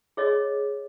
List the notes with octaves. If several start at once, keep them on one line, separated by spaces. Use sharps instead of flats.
G#4 C#5 D#5